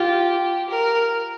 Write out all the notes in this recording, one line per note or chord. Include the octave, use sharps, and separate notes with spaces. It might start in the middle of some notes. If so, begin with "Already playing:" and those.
Already playing: F4 G4
A#4